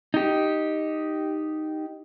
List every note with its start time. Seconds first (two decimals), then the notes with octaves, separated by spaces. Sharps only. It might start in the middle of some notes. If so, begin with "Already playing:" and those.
0.14 D#4 G4